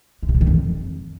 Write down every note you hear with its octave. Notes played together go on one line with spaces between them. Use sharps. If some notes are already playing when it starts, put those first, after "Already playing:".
G#3
C3
G3
D#3
F2